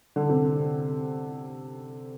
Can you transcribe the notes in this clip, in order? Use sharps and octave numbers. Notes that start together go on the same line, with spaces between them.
D3
C3